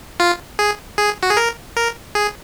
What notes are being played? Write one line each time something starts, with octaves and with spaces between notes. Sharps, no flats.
F4
G#4
G#4
F#4
G#4
A#4
A#4
G#4